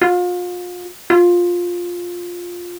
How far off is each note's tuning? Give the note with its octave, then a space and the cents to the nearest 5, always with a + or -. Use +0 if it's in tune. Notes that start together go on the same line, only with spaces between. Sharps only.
F4 +35
F4 +10